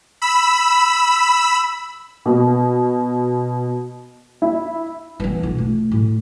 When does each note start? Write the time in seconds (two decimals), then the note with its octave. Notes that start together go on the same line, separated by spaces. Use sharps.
0.22 B5 E6
2.26 B2
4.42 E4
5.20 E3 B3
5.43 B1 F4
5.58 A3
5.92 A2